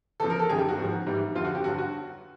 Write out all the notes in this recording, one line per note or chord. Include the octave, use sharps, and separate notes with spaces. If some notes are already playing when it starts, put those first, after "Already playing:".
E2 C#3 F3 A4
A#4
A4
F#2 D#3 G3 G#4
G4
F#4
G#2 F3
G#2 E3 G3
F2 D3 G3 F4
F#4
G4
G2 D3 F#3 F#4
F#4